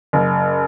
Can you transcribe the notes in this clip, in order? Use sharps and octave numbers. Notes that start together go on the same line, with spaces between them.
F#1